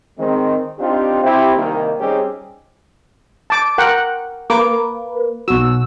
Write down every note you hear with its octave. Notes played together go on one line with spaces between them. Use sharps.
D#3 G#3 C4
C4 D4 D#4 F4 G4
C4 E4 G4
C2 D#3 A#3
G3 C4 C#4 D#4 G4 G#4
A5 D6
A#4 F#5 G5
A#3 B4 D6
B1 F#4 E6